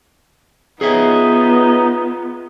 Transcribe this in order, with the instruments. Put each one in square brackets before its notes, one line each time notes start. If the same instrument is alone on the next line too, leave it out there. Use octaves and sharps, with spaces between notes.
[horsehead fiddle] B3 F4 [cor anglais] D#4 [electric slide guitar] G#4 C#5 E5